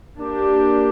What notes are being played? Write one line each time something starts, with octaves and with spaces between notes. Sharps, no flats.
A#3 D4 G4